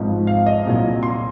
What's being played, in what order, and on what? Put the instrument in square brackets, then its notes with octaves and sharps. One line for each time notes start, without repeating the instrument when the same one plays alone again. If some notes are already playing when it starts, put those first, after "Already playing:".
Already playing: [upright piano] G#1 G#2 F3
F5
D#5
C2 A#2 F#3
C6